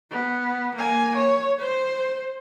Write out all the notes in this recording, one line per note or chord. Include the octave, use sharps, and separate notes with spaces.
B3
A#3 G#5
C#5
C5